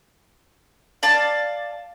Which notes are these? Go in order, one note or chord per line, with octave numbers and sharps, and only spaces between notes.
D5 F5 A5